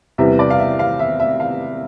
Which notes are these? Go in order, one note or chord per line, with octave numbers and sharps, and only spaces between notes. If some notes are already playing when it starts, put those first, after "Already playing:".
E2 C3 E3 G3 B3 E5
D5
F5
E5
F5
E5
E5
F5